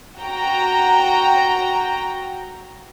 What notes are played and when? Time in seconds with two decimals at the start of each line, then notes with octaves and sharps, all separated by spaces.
0.18 F#4 G5 A#5